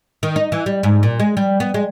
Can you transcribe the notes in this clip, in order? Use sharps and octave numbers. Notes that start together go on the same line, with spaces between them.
D#3
D#4
E3
G3
G#2
A#2
G#3
G3
B3
G#3